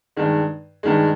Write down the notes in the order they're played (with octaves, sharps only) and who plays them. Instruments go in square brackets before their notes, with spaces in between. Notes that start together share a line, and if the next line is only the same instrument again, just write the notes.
[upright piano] G2 D#3 G#3
G2 D#3 G#3